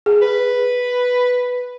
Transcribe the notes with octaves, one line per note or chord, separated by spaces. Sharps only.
G#4
B4